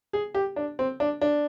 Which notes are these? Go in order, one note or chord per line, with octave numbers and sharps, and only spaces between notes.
G#4
G4
D4
C4
D4
D4